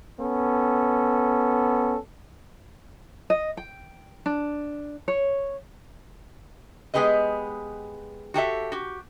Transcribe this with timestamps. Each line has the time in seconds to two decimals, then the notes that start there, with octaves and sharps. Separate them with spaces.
0.20 B3 C#4 A4
3.30 D#5
3.57 G5
4.26 D4
5.08 C#5
6.94 G#3 B3 G4 G#4 B4 D#5
8.34 F#4 G4 A4 E5
8.72 F#4 G4